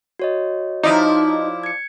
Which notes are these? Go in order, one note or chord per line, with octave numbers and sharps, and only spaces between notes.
F#4 C#5 D#5
F3 D#4 E4 D5
G#6 C#7